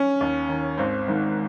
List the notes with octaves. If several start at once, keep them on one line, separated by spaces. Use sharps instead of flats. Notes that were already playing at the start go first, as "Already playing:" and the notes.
Already playing: C#4
D#2
D#3
G#1 C4
G#2 D#3